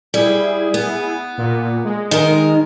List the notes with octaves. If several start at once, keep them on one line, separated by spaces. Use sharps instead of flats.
G3 E4 G#4
B3
A#2
G#3
D#3 A#4